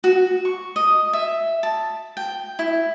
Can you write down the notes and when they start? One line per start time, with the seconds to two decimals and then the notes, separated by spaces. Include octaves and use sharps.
0.04 F#4
0.45 C#6
0.76 D#5
1.13 E5
1.63 A5
2.17 G5
2.59 E4